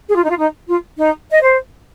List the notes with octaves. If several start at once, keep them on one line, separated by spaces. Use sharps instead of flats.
G#4
F4
D#4
F4
D#4
F4
D#4
D#5
C5